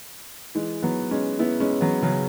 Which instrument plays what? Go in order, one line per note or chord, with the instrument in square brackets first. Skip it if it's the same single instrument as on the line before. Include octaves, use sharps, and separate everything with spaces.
[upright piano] E3 G#3
F#3 B3
G#3 C#4
B3 E4
G#3 C#4
F#3 B3
C#3 F#3